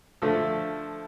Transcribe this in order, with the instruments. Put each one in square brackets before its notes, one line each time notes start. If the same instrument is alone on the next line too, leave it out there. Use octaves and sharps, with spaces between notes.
[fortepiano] D3 F3 A3 A4